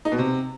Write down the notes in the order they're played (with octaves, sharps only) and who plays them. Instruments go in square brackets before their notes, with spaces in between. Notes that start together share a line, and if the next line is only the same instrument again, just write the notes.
[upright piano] D#4
B2
C3